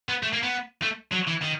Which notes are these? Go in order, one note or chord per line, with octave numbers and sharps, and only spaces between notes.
B3
A3
A#3
B3
A3
F#3
E3
D#3